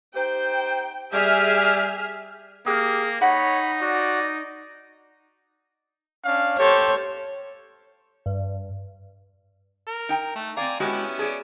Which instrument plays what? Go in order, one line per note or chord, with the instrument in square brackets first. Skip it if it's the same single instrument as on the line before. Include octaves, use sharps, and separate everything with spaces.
[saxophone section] D#4 G4 C5 [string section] G5
[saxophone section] G3 G4 D5 [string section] G#4 E5 F6
[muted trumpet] A#3 [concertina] G4 [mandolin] G#4 F6
[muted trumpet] D#4 [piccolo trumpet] C#5 [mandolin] F#5 [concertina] B5
[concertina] F#4 [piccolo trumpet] D5
[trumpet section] C#4 D4 F5
[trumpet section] G4 A4 C5 [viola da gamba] C#5
[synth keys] G2
[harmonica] A#4
[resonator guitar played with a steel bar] D#4 G5
[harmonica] A3
[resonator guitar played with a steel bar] C4 F5 [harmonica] D5 G#5 A#5
[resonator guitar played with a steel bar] G#3 F#4 G4 [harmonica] B3 C#4 E4
[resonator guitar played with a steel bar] G#4 D5